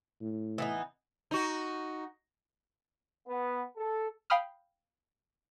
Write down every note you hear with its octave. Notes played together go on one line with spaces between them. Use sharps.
A2
E3 B3 D#4
D#4 F#4
B3
A4
F5 G5 B5 D#6 F6